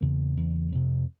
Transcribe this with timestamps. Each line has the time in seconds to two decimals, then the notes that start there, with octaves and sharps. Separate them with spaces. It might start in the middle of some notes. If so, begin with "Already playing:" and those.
0.01 E2 C#3 A#3
0.37 E2 C#3
0.72 F2 C3